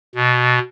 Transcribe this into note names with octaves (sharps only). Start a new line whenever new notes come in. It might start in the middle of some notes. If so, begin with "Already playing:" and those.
B2